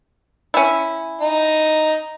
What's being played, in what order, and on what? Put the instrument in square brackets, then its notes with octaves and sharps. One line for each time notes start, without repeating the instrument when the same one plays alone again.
[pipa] C#4 E4
[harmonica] D#4